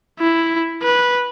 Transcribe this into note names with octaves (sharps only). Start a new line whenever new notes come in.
E4
B4